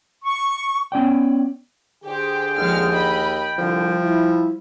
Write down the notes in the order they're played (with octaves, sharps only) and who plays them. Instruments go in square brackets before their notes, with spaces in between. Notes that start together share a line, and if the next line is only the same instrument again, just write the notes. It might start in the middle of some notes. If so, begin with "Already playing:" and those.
[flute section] C#6
[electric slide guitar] B3 C#4 D5 G5
[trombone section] D3 G#4 [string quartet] G4 C5 [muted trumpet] G5
[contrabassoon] D#2 [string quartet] F3 G#3 F6
[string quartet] D#5 B5
[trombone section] C2 D3 [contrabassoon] F3 [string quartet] G3
[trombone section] E4